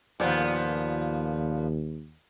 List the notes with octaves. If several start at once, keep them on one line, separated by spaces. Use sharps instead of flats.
D#2 A#2 F3 B3